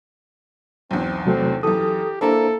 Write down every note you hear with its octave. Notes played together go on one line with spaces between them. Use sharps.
B1 E2 C4
C3 F#3 A3 C4
F#2 E3 G4 A4 D#6
A#3 D4 E4 A4 C5 A#5